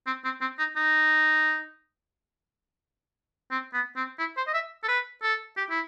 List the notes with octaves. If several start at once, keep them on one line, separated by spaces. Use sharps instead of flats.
C4
C4
C4
D#4
D#4
C4
B3
C4
E4
C5
D#5
E5
A4
B4
A4
G4
E4